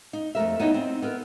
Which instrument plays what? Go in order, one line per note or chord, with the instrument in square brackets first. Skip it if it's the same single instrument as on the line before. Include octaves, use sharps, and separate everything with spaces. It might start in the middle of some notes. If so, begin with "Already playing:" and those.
[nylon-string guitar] D#4
F2 A3 A#4 E5
B3 D#4 E4 C#5 D#5 G#5
C4
B3 A#4